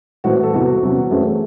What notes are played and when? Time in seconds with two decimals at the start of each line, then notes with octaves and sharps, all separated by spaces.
0.24 A2 E3 C4 F#4
0.43 A4
0.53 E2 C3 E3 C4 F#4
0.82 E2 C3 F#3 C#4
1.05 F#4
1.10 F#2 E3 A3 C4 G#4